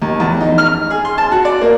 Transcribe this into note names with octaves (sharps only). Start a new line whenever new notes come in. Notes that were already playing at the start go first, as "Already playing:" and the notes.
D#2
E2
D#4
F6
G#4
C6
A5
F#4
D5
A#3